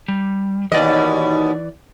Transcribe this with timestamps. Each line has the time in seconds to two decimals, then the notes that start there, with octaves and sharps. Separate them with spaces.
0.08 G3
0.72 D#2 B2 E3 D5 D#5